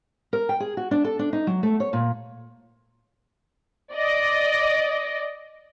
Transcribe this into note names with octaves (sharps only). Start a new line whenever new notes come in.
A#4
G5
G#4
F#4
D4
A4
D4
D#4
F#3
A3
C#5
A#2
D5 D#5